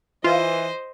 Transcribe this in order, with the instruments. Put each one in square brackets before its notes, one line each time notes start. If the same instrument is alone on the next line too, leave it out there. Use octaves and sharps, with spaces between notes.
[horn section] E3 [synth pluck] F4 [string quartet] C5 D#5